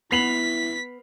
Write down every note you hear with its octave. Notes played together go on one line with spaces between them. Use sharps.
B3 E4 B6 C7 F7 F#7